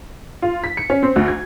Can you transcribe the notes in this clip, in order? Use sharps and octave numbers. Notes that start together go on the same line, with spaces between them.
F4
B6
C#7
C#4
C4
D2
G#6